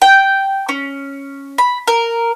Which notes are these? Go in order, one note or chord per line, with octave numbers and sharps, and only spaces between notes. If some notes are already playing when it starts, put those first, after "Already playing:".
G5
C#4
B5
A#4